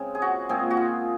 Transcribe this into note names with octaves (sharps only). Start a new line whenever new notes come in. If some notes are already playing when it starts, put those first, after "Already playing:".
Already playing: C#3 G#3 C4
G#4
F#4
A#2 G#3 C4 G#4
F#4
F4